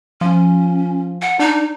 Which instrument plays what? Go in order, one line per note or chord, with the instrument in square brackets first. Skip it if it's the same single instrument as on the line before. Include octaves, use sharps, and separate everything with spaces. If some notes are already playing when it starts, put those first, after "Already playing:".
[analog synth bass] F3 [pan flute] C#4
[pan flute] F#5
[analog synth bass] D4 [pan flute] D#4